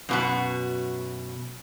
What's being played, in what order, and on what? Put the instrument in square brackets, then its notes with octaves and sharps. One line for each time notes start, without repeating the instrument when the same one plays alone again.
[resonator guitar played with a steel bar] F#2 B2 F#4